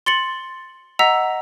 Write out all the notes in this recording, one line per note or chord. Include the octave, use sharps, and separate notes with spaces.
C6 A6 C#7 F#7
D#5 F#5 A#5 E6 B6 F7